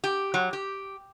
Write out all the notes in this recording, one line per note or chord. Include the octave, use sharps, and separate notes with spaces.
G4
F#3
G4